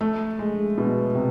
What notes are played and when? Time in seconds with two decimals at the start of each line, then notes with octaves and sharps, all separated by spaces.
0.01 A3
0.39 G#3
0.78 B2
1.15 C3